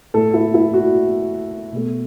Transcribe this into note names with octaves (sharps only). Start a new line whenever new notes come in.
A2 A3 A4
E4
E4
F#4
B2 A3